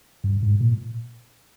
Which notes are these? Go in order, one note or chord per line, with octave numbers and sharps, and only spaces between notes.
G2
G#2
A#2